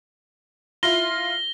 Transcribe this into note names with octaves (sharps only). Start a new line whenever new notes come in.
E4 F4 A#6 G7